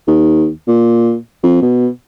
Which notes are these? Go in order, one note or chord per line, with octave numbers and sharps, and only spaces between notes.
D#2
A#2
F2
B2